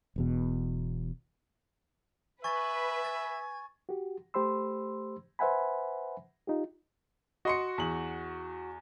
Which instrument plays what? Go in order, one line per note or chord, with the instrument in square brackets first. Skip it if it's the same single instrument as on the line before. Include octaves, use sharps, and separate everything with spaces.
[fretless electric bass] E1 E2 B2
[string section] B4 [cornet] E5 [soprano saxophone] G#5 [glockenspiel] C#6 A6
[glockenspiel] A6
[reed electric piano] F#4 G4
A3 G4 C5 B5 C6 E6
B4 C5 E5 F#5 G#5 B5
D#4 F4 G4
[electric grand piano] F#4 [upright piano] D#5 C6 C#7
[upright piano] E2 F#7